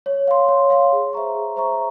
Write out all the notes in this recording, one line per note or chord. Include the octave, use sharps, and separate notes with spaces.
C#5
F5 C6
C#5
F5 C6
G#4
C5 E5 A#5 C#6
G#4
C5 E5 A#5 C#6